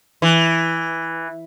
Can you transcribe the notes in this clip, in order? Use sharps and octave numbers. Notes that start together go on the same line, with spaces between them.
E3